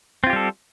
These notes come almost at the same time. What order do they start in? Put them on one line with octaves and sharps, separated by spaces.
C4 F4 G4 G3 A4